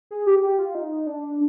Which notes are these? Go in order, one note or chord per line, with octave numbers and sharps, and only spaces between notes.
G#4
G4
G4
F4
D#4
D4